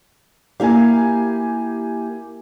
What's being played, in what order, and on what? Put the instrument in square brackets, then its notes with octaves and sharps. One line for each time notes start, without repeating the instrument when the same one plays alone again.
[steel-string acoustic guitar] A#3 E4 F5 [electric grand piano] G4 G#5